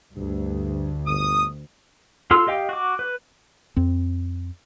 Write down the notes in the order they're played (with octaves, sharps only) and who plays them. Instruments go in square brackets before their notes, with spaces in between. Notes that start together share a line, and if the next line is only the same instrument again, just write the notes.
[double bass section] D2 [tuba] G2
[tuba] G1 [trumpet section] D#6
[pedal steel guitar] F4 A4 C6 E6 F6
G4 D#5 F5 G5
F#4 D6
B4
[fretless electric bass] F2 C4